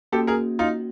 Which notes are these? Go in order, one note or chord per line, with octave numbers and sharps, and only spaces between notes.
A#3 C#4 F#4 G4 A4
G#4 A#4
D#4 F4